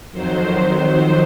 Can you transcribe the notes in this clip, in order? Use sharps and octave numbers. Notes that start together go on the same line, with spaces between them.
F2 D#3 F#3 C5